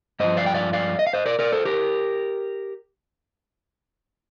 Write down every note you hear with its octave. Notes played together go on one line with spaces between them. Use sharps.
G2 F3 C5 D#5
D5 F5
G5
D5 F5
D5 F5
D#5
F5
C5 D#5
A#4 D5
A#4 D5
A4 C5
G4 A#4